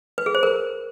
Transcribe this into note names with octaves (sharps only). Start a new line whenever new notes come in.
B4
G#4
C5
A#4